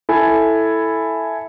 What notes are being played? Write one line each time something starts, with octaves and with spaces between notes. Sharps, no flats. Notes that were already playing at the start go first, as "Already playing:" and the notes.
E4 A4 G#5